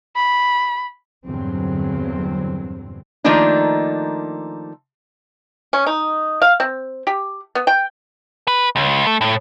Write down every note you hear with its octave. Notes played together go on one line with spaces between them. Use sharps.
B5
E2 G2 A#2 D3 F#3 C4
D#3 F3 A3 A#3 D4 D#4
C#4
D#4
F5
C4
G4
B3
G5
B4
C#2
A3
A2